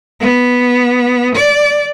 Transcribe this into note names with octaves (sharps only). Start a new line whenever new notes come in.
B3
D5